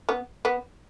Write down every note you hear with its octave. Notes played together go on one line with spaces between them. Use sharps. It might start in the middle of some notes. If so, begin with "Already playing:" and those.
B3
B3